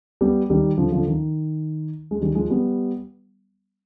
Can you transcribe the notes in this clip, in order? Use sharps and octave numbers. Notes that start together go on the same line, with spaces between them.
G3 B3
D#3 G3
D3 F3
D3 F3
D#3
G#3
D#3 G3
F3 G#3
G3 B3